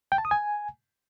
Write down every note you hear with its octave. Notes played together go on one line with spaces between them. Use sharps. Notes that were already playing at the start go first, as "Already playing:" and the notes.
G5
A5
D#6
G#5